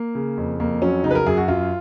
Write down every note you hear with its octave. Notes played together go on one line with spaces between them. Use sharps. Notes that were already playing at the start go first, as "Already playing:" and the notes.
Already playing: A#3
C#3
F2
F2 A#3
F#3 C#4
C#3 D#4
B4
A#4
F#2 G#4
F#4
F#2 F4